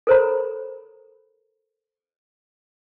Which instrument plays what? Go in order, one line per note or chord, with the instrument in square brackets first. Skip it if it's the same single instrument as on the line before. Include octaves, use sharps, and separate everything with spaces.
[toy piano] A4 A#4 C5 C#5 A#5 B5